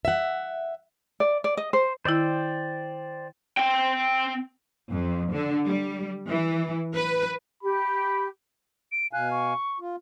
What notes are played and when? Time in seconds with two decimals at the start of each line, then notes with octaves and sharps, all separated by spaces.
0.05 E5 F#5
1.20 D5
1.44 D5
1.57 D#5
1.73 C5
2.05 D#3 E4 C5 D5 G5
3.57 C4 G5
4.88 F2
5.32 D3
5.66 G3
6.28 E3
6.95 B4
7.63 G4 B5
8.92 D7
9.13 B2 F5 G#5 F#6
9.31 C#6
9.80 F4